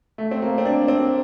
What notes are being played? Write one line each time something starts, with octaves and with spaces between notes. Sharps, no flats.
A3
C4
A#3
C4
D4
C4